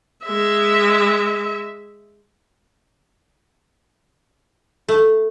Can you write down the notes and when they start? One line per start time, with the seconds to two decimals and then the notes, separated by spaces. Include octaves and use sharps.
0.25 G#3 E5
4.88 A3